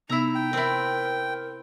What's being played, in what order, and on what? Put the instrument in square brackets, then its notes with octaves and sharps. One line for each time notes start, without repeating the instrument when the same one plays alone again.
[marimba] C3 B3 E6 [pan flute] D#4 [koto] E4 A#5
[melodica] G5
[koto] C4 E4 [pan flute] A#4